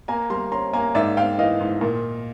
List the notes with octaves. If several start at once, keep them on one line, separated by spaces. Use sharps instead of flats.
A#3 G#5 A#5
G3 A#5 C6
C#4 A#5 C6
A#3 G#5 A#5
G#2 D5 E5
G#2 F5 G5
E3 D#5 F5
G#2
A#2